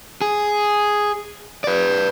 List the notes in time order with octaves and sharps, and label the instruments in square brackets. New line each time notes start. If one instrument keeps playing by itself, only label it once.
[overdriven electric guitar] G#4
B4 D5